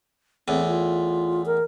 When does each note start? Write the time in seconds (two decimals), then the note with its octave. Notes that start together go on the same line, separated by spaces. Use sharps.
0.48 E2 A2 C4
0.68 F4
1.46 A#4